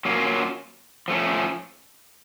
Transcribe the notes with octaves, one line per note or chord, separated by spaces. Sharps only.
F#3 A#3 C#4 F4
F3 A3 C#4